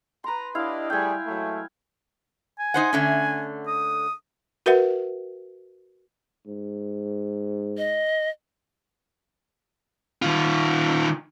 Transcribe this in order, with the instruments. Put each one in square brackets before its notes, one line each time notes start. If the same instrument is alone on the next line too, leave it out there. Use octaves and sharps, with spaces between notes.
[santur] B4 C6 [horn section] A#5
[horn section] D4 G4 D#5 [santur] E4 F5
[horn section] G3 A3 G#4 [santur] G5 G#5
[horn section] F#3 G#3 A3
[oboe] G#5
[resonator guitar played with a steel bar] D#4 C5 F#5
D3 A3 C#4
[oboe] D#6
[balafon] F#4 A#4 B4 E5 F#5
[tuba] G#2
[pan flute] D#5
[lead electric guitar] D#3 F4